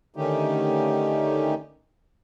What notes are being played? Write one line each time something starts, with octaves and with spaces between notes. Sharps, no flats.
D3 D#3 A3 C#4 D#4 G4